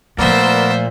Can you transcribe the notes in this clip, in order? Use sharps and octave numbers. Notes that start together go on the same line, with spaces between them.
A#2 F3 A3 B3 A#4 C5 D5 E5